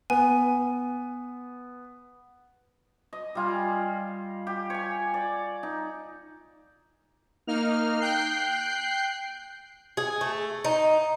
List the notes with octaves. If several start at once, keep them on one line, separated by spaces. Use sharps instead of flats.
B3 G#5
D#5
G3 F4 G#5
G4
C#5 G#5
D5
D#4
A#3 D#4 F6
G5 F#6 G6 C7
G#4
A3
D#4